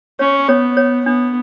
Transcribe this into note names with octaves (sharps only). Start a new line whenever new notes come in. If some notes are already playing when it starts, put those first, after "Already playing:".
C#4 C#5
B3 C#5
C#5
B3 D4